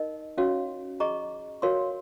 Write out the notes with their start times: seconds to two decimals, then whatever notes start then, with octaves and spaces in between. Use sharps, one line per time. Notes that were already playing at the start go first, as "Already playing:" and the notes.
Already playing: D#4 A#4 D#5
0.38 C#4 F#4 C#5 F5
1.00 G#4 D#5 A#5 C#6
1.62 F#4 A#4 C#5 F5 C6